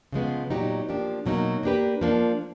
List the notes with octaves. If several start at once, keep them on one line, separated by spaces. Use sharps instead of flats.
C#3 F3 G#3 B3
A#2 F#3 B3 D#4 G4
F3 A#3 D4 G4
B2 F#3 A#3 D#4
A#3 D4 G4 B4
F3 A#3 D4